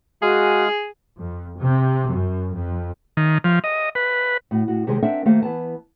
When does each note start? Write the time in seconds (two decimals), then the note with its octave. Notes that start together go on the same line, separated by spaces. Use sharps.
0.22 G#3 F#4 G#4 F5 D#6
1.19 F2
1.57 C3
2.09 F#2
2.54 F2
3.17 D#3
3.44 F3
3.64 D#5
3.95 B4
4.51 A2 F#4
4.68 A2 F#4
4.87 C3 D#3 G#3 G4 G#4 C5
5.02 C4 D4 A#4 E5 F#5
5.25 D#3 A3 A#3 G4 C5 F5
5.42 E3 B3 A5